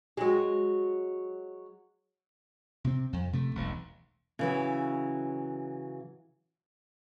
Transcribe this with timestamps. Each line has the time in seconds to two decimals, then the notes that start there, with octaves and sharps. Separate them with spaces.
0.17 F#3 G#3
2.84 C3 C4
3.13 F2
3.33 C3 A3
3.55 E1 B1
4.39 C#3 E3 F#3